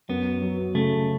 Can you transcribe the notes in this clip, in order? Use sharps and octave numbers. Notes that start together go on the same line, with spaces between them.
F#2 B3
F#3
C#3 A3